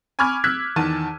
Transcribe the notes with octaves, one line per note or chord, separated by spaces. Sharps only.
G#5 B5 C#6 D6 F6 G#6
E6 F#6 G#6 B6
E2 D#3 A5 D#7